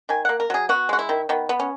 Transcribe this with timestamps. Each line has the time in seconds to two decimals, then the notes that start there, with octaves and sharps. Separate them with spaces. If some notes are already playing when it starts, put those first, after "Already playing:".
0.09 D#3 G#5
0.25 A#3 F#5
0.40 A#4
0.50 F#3 G#4
0.69 B3 F#4
0.89 G#3 F#4
0.99 E4
1.09 D#3
1.29 D#3 B3
1.49 B3
1.59 C#4